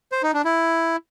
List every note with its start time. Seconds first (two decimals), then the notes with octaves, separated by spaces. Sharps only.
0.12 C5
0.23 D#4
0.34 D4
0.45 E4